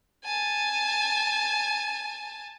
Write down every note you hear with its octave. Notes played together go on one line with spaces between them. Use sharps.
G#5 A5